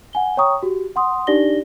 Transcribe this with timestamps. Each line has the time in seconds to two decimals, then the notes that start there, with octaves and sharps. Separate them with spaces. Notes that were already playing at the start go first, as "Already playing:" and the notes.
0.13 F#5 G#5 G7
0.37 C#5 G5 A#5 C#6 D#6
0.63 F#4 G4
0.96 F#5 C6 D#6
1.27 D4 D#4 G4 D5 A#6 G7